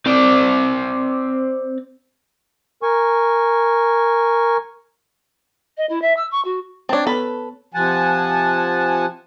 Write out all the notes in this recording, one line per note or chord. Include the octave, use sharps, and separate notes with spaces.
C4 D5
A#4 G#5 C#6
D#5
E4
E5
E6
C#6
F#4
C4 D4 C#5 A5
B3 A4 B4 B5
C3 F3 F#5 G#5 A5